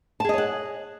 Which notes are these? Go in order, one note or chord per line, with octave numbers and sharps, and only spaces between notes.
G#4 C#5 D#5 F#5 A5